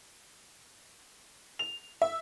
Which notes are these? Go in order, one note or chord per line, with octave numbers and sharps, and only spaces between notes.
F7
E5